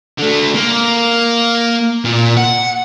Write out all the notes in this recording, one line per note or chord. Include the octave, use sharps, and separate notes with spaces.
D3 A3
A#3
A#2
F#5